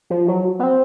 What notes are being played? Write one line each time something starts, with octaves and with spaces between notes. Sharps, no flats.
F3
F#3
B3
C4